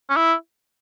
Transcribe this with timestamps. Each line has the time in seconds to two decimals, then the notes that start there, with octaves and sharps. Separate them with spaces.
0.10 C#4
0.16 E4